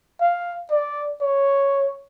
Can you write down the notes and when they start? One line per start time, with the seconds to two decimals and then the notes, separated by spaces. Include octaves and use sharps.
0.21 F5
0.71 D5
1.21 C#5